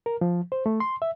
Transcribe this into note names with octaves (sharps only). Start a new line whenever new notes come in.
A#4
F3
C5
A3
C6
E5